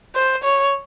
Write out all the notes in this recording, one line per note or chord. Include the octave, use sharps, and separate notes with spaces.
C5
C#5